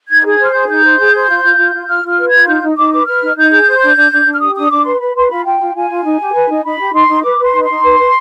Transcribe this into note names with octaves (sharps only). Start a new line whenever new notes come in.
D#4 G#6
G#4
G#6
C5
F6
G#4 G6
D#4 G6
C5
G#4
C5
F4
F4
F4
F4
F4 F6
F4
F6
B4
F4 G#6
D#4 G6
D#4
D#4 D6
B4 D6
B4 F6
D#4
D#4 G6
G#4
C5
D4
D4
D4
D4
F6
G4 D#6
D4 D#6
D4 D6
B4 C6
B4 B5
B4 C6
F4 B5
F4 G5
F4
F4 G#5
F4
D#4
G4
B4
D#4
D#4 B5
G4
D#4 C6
D#4
B4 D6
B4
C6
D#4
C6
D#4
B4
B4